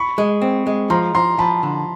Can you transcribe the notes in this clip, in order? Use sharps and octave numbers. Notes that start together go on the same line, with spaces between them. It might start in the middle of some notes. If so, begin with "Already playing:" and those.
Already playing: B5 C#6
G#3
C4
G#3
F3 A#5 C6
F3 A#5 C6
F3 A5 B5
D3